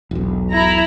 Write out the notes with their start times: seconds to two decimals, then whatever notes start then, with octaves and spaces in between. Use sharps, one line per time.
0.11 E1 B1
0.52 E4 A#5